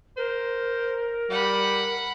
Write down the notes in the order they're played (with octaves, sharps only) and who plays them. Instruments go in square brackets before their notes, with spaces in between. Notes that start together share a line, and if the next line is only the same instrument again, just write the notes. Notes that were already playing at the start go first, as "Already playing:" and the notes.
[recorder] A#4 [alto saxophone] C5
[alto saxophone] G3 [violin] F#5 B5